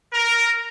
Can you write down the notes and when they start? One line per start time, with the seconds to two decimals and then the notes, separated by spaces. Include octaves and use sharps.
0.13 A#4